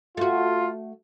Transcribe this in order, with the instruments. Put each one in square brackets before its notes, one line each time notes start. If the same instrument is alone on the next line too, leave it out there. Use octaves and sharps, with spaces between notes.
[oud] A3 F#4 [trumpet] F4